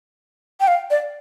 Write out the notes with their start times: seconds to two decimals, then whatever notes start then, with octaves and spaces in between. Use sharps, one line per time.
0.60 G5
0.68 F5
0.91 D5